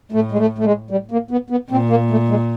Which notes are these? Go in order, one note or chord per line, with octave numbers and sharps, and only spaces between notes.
A2 A3
G#3
A3
A3
G#3
G3
A#3
B3
B3
A#2 C4
A#3
A3
G#3